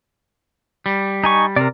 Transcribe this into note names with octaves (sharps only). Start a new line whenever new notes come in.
G3
D#4 G#5 C#6
C3 A#4 D5